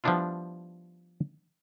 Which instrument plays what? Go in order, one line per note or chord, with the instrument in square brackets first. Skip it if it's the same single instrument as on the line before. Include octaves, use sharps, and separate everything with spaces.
[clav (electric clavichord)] F3 G3 B3 D4 E4 F4